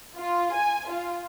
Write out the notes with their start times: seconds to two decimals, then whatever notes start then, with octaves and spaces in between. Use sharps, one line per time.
0.17 F4
0.55 G#5
0.90 F4